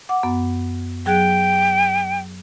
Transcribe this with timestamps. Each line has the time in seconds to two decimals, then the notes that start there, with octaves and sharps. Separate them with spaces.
0.09 F#5 D6
0.23 F#2 B3
1.06 F#3 G#4 G5 F#6